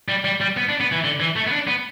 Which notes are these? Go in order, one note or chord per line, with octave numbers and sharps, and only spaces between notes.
G3
G3
G3
B3
D4
B3
E3
D3
E3
A3
B3
D4
B3